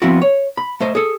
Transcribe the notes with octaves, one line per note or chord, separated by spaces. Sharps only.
F3 B3 C4 E4 F#4
C#5
B5
A3 C5 D#5
G#4 A4